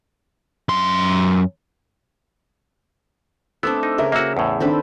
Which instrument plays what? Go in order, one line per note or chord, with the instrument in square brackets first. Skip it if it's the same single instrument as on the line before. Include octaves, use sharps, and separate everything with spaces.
[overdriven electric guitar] F#2 C6
[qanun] A3 C4 D4 [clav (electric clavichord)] B3 [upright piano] E6
[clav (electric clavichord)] D#4
[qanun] C#3 A#4 [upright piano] E5
[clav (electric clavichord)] A#3 F#4 [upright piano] E5 E6
[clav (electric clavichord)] E2 A2
[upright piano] D#3 D4 [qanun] C4 A4 B4